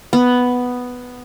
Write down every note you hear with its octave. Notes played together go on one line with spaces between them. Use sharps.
B3